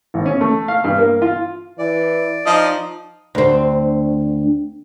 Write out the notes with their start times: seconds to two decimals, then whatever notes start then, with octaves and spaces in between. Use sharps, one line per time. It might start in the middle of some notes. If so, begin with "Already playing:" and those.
0.14 G#1
0.26 C#4
0.41 A3
0.68 F5
0.84 G2
0.98 A#3
1.22 F4
1.79 E3 D5
2.46 F3 D#4 D#5
3.35 D2 C4